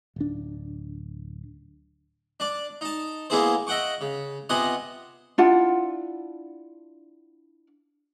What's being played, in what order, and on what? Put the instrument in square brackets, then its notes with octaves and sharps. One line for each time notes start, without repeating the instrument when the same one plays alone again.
[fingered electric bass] D1 D4
[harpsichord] D4 D5
D#4 A5
G#3 A#3 B3 E4 G#4 C5
D#5 E5 F#5 G5 C#6
C#3
C3 B3 F4 D#5 F#5 G#5
[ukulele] D4 E4 F4 F#5